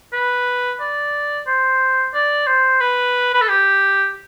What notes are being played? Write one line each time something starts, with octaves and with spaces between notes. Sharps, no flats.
B4
D5
C5
D5
C5
B4
B4
A4
G4